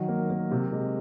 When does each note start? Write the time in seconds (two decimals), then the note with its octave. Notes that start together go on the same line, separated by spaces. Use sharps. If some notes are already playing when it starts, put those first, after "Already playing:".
Already playing: D#3 F#3
0.08 A#3
0.30 A#3
0.51 C3
0.72 G#3